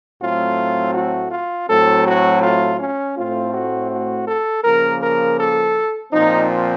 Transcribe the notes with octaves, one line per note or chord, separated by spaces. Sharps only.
A2 F#3 A3 C4 F4
F#4
F4
A2 F#3 A3 C4 A4
F#4
F4
C#4
A2 A3 C4 F4
F#4
F#4
A4
C#3 F3 A#3 A#4
A#4
A4
A#2 F3 C4 D#4